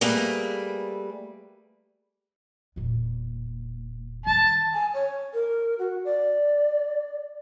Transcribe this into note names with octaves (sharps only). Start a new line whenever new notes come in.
G3 A3 A#3 G#4 B4
E1 A#2
D#3 G3 A5
G#5
C#5
A#4
F#4
D5